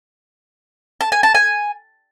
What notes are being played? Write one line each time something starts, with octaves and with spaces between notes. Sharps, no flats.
A5
G#5
A5
G#5